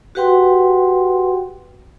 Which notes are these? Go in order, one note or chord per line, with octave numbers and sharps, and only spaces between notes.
F#4 G4 B4 F#5 G5 C6